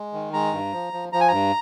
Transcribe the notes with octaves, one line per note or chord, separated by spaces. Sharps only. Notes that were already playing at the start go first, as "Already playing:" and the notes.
Already playing: G#3
D#3
G#3 A#5
G2
F3
F3
F3 A#5
G#5
G2 A#5